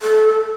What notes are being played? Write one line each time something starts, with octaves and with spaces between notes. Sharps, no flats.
A4